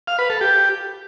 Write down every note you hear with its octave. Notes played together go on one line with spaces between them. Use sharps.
F5
B4
A4
G4